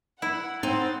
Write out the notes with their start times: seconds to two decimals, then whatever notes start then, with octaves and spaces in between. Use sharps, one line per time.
0.22 E4 F#5
0.63 C4 D#4 F#5 A6